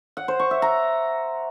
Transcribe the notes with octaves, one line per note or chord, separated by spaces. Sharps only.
F#5
C5
C#6
E5
A#5